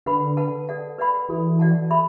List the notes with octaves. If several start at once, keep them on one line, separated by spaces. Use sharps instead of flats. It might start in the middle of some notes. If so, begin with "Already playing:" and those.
D3 B4 F#5 B5
B4 F#5 A5
A4 D5 F#5 A5
B4 D5 F#5 B5
E3 F#4 A4 D5
F#4 D5 F#5 A5
A4 E5 B5